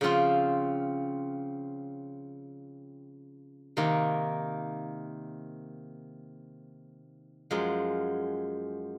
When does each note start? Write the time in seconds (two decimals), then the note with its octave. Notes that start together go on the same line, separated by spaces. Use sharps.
0.01 C#3 F3 C4 F4
3.77 C3 D#3 A#3
7.51 F#2 F3 G#3